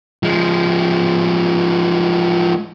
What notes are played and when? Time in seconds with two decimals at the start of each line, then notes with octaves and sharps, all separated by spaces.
0.23 F3 G#3